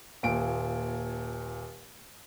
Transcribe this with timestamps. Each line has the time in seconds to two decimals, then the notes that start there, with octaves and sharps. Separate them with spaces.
0.23 D#1 A#2 D7